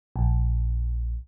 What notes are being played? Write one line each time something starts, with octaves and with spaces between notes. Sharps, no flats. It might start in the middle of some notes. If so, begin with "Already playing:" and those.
A#1